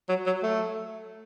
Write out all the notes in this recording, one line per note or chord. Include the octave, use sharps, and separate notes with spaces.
F#3
F#3
A3